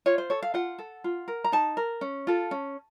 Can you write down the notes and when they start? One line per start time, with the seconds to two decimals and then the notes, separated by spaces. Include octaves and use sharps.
0.06 F4 C#5
0.18 C5
0.30 A4 C#5
0.42 F5
0.54 F4 F#5
0.79 A4
1.04 F4
1.28 A#4
1.44 A#5
1.52 D#4 A5
1.77 A#4
2.01 C#4
2.27 F4 A4
2.51 C#4